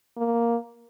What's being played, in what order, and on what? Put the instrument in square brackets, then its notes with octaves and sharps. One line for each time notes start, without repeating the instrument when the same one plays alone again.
[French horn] A#3